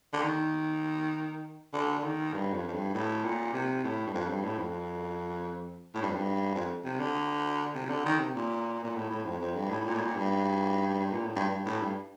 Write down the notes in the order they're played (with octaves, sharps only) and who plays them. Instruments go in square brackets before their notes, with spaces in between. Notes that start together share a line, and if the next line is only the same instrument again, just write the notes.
[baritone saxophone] D3
D#3
D3
D3
D#3
G2
F2
F2
G2
A2
A#2
C3
A2
G2
F2
G2
A2
F2
A2
G2
F2
G2
F2
C3
D3
C3
C3
D3
D#3
C3
A#2
A#2
A2
A2
F2
F2
G2
A2
A2
A#2
A2
A#2
G2
A#2
A2
G2
G2
A2
G2